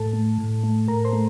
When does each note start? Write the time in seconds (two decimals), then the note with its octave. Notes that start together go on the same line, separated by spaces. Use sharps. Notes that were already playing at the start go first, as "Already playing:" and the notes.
Already playing: A2 A4 A5
0.13 A3
0.38 A2
0.64 A3
0.88 A2 A#4 A#5
1.05 C5 C6
1.13 A3